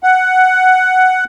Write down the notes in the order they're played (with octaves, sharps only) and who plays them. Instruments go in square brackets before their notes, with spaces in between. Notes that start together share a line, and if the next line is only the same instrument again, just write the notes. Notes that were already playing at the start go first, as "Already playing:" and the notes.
[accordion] F#5